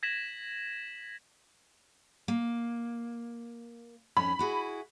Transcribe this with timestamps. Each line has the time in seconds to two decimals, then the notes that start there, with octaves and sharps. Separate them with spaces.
0.03 G#6 A#6 B6 E7 F#7
2.28 A#3
4.17 F2 C#4 B5
4.39 E4 F#4 G#4